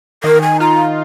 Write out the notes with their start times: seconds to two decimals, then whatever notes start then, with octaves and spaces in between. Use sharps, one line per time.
0.24 D#3 A#4
0.42 G#5
0.60 F4 A#5